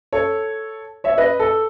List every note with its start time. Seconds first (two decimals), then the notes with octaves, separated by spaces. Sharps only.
0.13 A4 C#5
1.04 C#5 E5
1.18 B4 D#5
1.40 A4